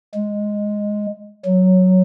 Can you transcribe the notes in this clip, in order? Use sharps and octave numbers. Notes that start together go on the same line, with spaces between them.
G#3
F#3